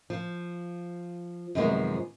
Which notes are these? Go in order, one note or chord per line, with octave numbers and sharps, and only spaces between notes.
F3
F#2 C3 D#3 F3 G#3 B3